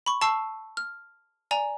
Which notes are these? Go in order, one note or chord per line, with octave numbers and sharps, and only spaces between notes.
B5 C#6
A5 C#6 E6 C7
F6
D5 G#5 A#5